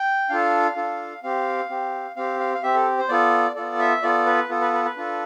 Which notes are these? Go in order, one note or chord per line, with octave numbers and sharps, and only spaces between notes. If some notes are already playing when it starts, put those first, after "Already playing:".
Already playing: G5
D4 F4 A4 F5
D4 F4 A4
C4 G4 F5
C4 G4
C4 G4 F5
F5
F5
C4 G4 E5
A4
C5
B3 F4 A4 D5
B3 F4 A4 D5
E5
B3 F4 A4 D5
B4
B3 F4 A4
B4
B4
B4
D4 F4 A4